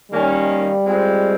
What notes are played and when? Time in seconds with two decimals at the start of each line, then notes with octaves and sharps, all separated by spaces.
0.12 D#3 G3 A#3 C#4
0.85 G#3 C4 F4